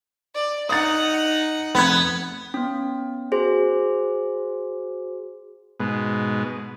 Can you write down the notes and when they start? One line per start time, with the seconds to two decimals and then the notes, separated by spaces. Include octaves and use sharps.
0.34 D5
0.69 D#4 F#5 D#6 A6
1.75 F1 B3 G#6
2.54 B3 C#4
3.32 F#4 G#4 C5
5.80 G#2 B2